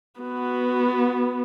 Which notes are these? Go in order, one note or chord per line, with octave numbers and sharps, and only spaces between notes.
B3 F#4